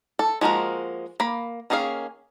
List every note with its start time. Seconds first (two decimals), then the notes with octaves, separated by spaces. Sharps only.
0.19 A4
0.41 F3 G#3 A#3 F#4 A#4
1.20 A#3 B5
1.70 D#3 A#3 C#4 G#4 F5